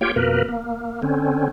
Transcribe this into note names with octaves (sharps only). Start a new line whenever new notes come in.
A#3 F4 G4 C#5 G5
F2 B2 A#3 A#4 B4
A#3
D3 C4 C#4